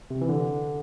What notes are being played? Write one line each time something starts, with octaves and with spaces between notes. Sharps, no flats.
C3
E3
D3